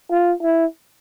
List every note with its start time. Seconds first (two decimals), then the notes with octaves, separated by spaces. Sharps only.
0.11 F4
0.43 E4